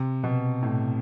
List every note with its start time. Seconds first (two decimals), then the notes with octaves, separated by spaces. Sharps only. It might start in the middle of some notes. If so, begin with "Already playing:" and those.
Already playing: C3
0.24 B2
0.63 A2